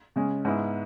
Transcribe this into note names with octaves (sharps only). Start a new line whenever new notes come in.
C#3 G#3 C#4
G#2 G#3 B3 E4